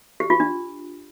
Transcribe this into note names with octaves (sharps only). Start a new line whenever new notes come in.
G4
F4
D4